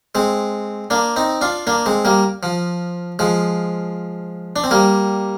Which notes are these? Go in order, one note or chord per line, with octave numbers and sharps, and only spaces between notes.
G#3 C4
A#3 D4
C4 D#4
D4 F4
A#3 D4
G#3 C4
G3 A#3
F3
F3 G#3
D4
C4
G3 A#3